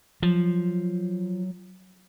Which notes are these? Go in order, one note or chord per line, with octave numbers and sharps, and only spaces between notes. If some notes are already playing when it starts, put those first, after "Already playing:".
F3 F#3